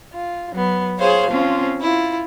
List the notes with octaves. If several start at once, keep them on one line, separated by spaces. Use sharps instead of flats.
F4
F#3 B3
F4 G#4 C5 C#5 F5
F3 C4 C#4 F4
E4 F4